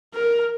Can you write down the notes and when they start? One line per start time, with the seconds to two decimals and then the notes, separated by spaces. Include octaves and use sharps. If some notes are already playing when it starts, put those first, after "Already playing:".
0.14 A#4